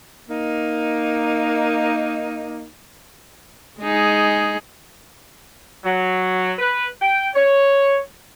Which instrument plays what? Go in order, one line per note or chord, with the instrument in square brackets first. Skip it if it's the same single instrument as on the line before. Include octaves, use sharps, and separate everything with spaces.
[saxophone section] A#3 D#4
[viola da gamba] G#3 D#4 G#4
[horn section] F#3
B4
G5
C#5